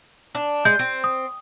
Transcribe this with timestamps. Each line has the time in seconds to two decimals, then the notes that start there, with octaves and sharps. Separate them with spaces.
0.35 D4
0.65 G#3 G6
0.79 C4
1.04 D#6